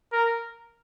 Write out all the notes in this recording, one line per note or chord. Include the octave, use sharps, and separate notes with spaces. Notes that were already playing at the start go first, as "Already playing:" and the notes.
A#4